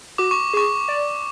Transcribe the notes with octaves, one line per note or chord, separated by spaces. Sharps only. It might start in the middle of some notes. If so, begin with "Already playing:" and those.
F#4 D6
C#6
G#4 C#6
D5